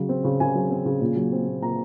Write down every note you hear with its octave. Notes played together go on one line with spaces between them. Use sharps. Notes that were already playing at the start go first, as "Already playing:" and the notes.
Already playing: C#3 F#3
C4
C#3
C#3 G#5
F#3
C4
C#3
A#2
F#3
C4
A#2
A#2 A#5